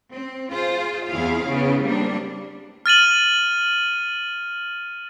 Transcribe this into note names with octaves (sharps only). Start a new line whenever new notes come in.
C4
F4 G#4 C5
E2 C4 E4 G#4 F5
C#3 B3 E4
G3 A#3 C4 D4
F6 A6 D#7 F#7